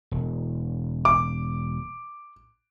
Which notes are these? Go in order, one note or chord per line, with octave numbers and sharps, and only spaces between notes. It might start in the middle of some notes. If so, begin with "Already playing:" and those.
E1
D6